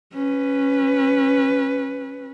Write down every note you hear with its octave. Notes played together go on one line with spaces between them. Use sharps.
C#4 B4